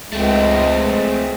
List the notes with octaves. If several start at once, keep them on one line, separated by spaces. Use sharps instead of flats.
C#2 G#3 A3 C4